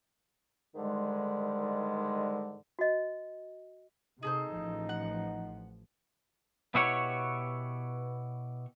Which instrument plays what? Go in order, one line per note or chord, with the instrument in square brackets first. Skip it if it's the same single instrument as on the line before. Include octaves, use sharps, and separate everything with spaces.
[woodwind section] G#2 D3 D#3 G3 G#3
[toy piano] F#4 D#5
[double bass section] C3 [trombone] D#4 [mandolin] G#4 A4 C5
[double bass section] A1 F3
[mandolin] F#5
[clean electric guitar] B2 B3 E4 F#4 G4 C#5